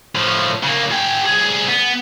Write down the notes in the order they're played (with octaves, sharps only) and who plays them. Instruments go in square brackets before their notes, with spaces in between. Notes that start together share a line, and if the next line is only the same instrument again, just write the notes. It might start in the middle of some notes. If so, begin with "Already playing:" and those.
[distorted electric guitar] A2 F3
C#3 A#3
G#4 G5
C2 G#4
B3